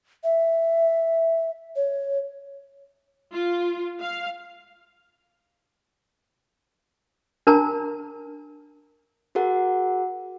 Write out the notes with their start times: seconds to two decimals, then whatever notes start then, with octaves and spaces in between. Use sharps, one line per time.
0.24 E5
1.76 C#5
3.31 F4
4.00 F5
7.47 D4 A#4 A5 A#5
9.35 F#4 G#4 A#4 F#5